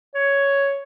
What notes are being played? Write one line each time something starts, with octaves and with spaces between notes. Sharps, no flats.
C#5